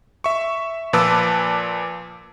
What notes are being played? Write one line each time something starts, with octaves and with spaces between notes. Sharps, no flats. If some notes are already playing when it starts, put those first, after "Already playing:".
E5 C#6
A#2 F3 B4 A5 D6 E6